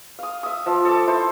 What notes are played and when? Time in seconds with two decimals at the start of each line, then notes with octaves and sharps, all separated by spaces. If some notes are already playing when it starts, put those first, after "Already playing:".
0.19 F5 D#6
0.43 E5 D#6
0.66 F3 E5
0.85 A4 E5 D6
1.07 E4 C5